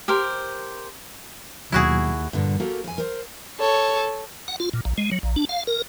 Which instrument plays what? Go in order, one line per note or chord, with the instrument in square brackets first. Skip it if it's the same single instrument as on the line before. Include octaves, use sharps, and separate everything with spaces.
[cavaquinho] G4 A#4 C5
[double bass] D#2 [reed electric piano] B2 F#3 [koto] E4 F#4 G#4
[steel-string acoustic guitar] G2 A#2 D3
A#3 F#4 G4 A4 A#4
F2 G#5
A#4 C5
[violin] A4 C#5
[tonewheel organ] F#5
F4
A#2
A#1
G#3
F#3
A#1
D4
F5
A#4